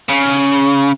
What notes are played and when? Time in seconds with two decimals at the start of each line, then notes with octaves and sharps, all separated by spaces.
0.09 C#3